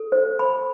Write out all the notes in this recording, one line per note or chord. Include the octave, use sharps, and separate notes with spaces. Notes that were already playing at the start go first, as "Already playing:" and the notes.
Already playing: A4
C5
B5